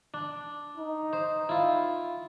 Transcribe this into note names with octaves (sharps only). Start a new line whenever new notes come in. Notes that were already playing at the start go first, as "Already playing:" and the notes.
D4
D#4
C5
E4 F4